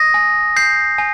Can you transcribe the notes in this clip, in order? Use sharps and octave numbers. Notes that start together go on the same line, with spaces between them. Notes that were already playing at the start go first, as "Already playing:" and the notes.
Already playing: D#6 A#6
G#5
G6 C7
G#5